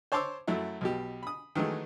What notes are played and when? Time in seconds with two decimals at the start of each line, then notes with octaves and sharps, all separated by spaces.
0.12 C5 C#5 A5 C6 D6 E6
0.48 F#2 F#3 A3 E4
0.81 B1 B2 G4
1.23 B5 D#6
1.55 D#3 E3 F#3 G#3 A3